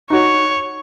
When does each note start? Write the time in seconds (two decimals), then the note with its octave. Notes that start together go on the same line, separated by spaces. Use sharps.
0.10 D#4 F#4 C#5